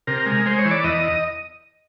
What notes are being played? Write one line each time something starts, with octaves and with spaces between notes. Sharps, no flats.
C3 A#4
G#3
G#3 C5
C#5
E3
D5
E2 D#5